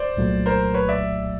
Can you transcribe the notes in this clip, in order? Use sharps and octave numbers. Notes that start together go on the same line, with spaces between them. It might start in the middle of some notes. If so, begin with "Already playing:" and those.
Already playing: C5 D5
C2 A#2 F#3 A3
A#4 C5
B4 C#5
D5 E5